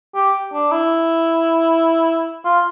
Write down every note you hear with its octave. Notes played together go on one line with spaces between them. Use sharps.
G4
D4
E4
F4